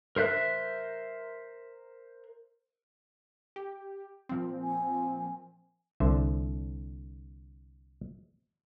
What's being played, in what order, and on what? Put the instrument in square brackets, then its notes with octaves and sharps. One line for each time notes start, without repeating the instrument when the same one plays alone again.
[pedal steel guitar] A#4 C5 E5 F#6
[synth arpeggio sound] G4
A#2 F3 C4
[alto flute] G#5
[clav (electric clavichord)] C2 D3 C5 E5